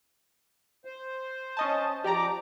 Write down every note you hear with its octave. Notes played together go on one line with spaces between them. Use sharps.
C5
C#4 D#5 A5
F3 G4 D5 A#5 D6